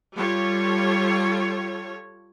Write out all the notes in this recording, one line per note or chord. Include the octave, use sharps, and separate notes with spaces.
G3 F4 A4 C#5